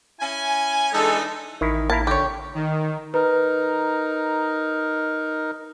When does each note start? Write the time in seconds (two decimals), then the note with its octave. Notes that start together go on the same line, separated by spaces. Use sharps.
0.20 C#4 E4 G#5
0.93 E3 G#3 D4 D#4 A4
1.61 A1 D#3 E4
1.90 A#3 E4 A#4 A5
2.07 D3 G4 C#5
2.55 D#3
3.14 D#4 A#4 B4